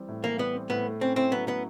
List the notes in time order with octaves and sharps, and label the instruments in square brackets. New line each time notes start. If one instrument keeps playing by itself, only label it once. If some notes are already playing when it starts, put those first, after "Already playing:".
Already playing: [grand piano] E3 G3 C4
A2
[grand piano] E3 [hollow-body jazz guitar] A#3
[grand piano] G3 [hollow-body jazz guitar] B3
[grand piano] C4
[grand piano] A2 [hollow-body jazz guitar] B3
[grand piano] A3
[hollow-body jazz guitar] C4 [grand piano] C#4
[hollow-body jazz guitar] C4 [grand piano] E4
[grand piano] F#3 [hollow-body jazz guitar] B3
[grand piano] A3 [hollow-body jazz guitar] B3